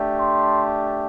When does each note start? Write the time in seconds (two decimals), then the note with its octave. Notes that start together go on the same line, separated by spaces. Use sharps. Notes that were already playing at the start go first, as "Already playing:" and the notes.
Already playing: A3 D4 G4
0.18 C6